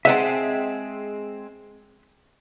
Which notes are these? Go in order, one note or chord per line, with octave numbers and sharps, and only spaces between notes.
G#3 C4 E5 F#5 A5